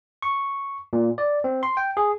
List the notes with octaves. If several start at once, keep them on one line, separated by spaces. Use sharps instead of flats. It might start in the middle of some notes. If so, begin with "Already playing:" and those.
C#6
A#2
D5
C4
C6
G5
G#4